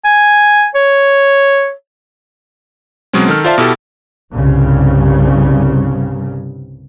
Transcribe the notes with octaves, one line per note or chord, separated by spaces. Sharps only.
G#5
C#5
B2 F#3 G#3 C4 C#4
D#3 A4 F6
F4 C5 D5 E5 F5 A5
B2 E4 G4 A4
C2 G2 C#3